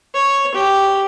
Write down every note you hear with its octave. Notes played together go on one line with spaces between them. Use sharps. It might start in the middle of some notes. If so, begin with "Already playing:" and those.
C#5
G4